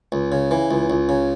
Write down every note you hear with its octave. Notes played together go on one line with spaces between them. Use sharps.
C#2
C#3
E3
C#2
C#2
C#3